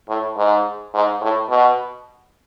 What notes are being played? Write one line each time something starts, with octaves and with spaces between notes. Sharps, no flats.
A2
G#2
G#2
A2
B2